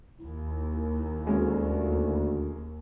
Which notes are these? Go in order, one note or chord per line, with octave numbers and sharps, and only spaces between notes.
D#2 E4
D2 G#3 C#4